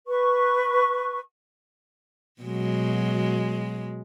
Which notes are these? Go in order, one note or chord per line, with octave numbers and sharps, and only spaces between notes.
B4 C#6
B2 F#3 G#3